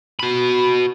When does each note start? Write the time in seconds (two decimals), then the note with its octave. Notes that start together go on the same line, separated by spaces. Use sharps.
0.19 F#4 B5